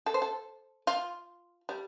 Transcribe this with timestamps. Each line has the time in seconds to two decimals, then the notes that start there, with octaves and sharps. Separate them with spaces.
0.06 A4
0.14 C5
0.22 A4
0.87 F4
1.69 G3